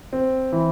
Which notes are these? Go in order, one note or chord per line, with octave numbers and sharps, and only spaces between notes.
C4
E3